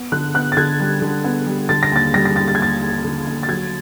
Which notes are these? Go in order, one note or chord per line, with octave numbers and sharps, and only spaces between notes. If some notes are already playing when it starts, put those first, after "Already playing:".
Already playing: B3
D3 F#6
B3 F#6
A6
D3 G#6
G3
D3
B3
G3
D3 A6
A#6
D#2 A6
G3 A#6
A#6
D#2 A6
A6
G#6
D#2 A6
D#2
D3
D#2
A6
F#3 G#6